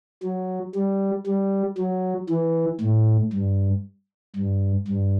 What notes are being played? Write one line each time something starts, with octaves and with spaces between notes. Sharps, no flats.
F#3
G3
G3
F#3
E3
A2
G2
G2
G2